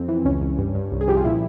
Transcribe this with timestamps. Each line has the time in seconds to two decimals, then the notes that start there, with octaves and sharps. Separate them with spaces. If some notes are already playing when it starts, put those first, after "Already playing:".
Already playing: F2 C4
0.08 E3
0.25 C#2 C#4
0.41 C#2
0.58 G2
0.75 G2
0.92 C2
1.01 G#4
1.08 F3 G4
1.17 F4
1.24 A#2 E4